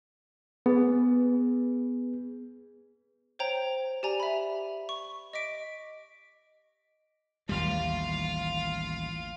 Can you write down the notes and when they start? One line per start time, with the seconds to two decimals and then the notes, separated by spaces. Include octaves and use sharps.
0.66 B3 G#4 B4
3.39 C5 C#5 G5 A#5
4.03 G4 D5 G#5 A#5
4.20 E5 B5
4.89 C#6
5.33 D#5 D6 B6 D7
7.49 A1 D#2 G3 F4 F5